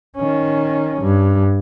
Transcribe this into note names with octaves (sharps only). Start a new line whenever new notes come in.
D#3 C#4
G2